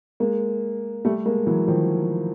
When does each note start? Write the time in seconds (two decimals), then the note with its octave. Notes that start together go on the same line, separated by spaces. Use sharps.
0.20 G#3 A#3
1.05 G3 A3
1.26 G#3 A#3
1.46 E3 F#3
1.68 D#3 F3